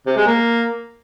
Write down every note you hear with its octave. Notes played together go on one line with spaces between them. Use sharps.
C3
G#3
A#3